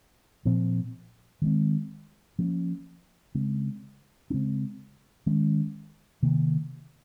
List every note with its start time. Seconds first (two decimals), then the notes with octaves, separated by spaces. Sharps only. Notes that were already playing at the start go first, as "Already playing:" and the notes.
0.45 A#2 F3 C4
1.42 D#3 G#3 C4
2.39 F3 A#3 C#4
3.35 C#3 G#3 C4
4.30 C#3 G#3 C4
5.26 D#3 G#3 C#4
6.23 C3 D#3 A#3